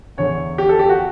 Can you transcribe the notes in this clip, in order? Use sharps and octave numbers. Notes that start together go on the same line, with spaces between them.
E2 D3 C#5
G4
A4
G4
F#4